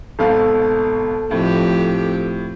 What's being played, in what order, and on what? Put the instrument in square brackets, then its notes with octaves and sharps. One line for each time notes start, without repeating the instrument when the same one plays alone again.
[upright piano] G#1 B2 F5 [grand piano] A4
[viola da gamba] F2 G4 [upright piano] A2